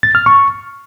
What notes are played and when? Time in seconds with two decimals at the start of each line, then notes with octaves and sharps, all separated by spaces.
0.03 A6
0.15 F6
0.26 C#6